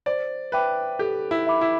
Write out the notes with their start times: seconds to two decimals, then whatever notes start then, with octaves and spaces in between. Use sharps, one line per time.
0.06 C5 D5
0.52 B4 E5 G5 D6
0.99 G4 A4
1.31 E4
1.47 E5 B5 D6
1.61 E4